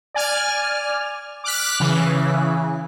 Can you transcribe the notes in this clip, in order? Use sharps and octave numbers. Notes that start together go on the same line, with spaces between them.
D5 G#5 F6
D6 F6 F#6 B6
C#3 E3